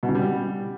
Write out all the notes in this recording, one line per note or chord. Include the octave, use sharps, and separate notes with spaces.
B2
C#3
G3